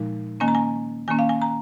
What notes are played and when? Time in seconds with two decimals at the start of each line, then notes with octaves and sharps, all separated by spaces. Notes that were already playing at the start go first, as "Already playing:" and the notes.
Already playing: A#2 F3 G#3 D#4
0.40 D#3 A#3 C#4 G#5
0.48 A#5
0.55 G#5
1.08 D#3 A#3 C#4 G#5
1.19 F5
1.29 G#5
1.42 A#5